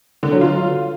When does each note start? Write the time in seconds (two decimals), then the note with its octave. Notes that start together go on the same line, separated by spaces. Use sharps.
0.23 D3
0.32 F#3
0.41 F4